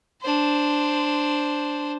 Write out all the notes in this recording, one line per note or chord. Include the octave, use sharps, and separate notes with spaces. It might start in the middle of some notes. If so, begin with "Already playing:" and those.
D4 C5